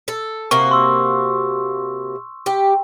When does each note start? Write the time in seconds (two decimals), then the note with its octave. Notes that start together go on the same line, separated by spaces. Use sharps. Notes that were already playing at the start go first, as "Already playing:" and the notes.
0.08 A4
0.51 C3 A#3 F#4 C#6
0.71 C6 E6
2.46 G4